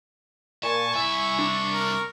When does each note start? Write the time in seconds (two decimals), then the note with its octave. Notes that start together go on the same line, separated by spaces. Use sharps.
0.63 A#2 G#5 A5 C#6
0.95 C2 E4 E5 G#5
1.39 D4
1.73 A#4